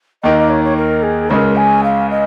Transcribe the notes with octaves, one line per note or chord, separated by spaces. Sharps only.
D#2 D#3 A#3 D#4 D#5
D#5
C#5
C#5
A#4
G#4
C#2 C#3 G#3 C#4 A#4 C#5
G#5
F5
D#5